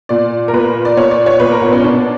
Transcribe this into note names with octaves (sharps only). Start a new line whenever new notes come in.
A#2 D5
A#4
A#2 B4
D5
A#2 C#5
D5
C#5
A#2 B4
A#4
B3
C#4
B2 D4